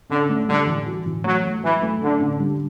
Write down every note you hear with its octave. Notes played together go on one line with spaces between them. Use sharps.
D3 C#4
A3
D3 G3
E3
F#4
E3
F#3 A3
A3
E3 F#3
A3
D3 C#4
D3
G3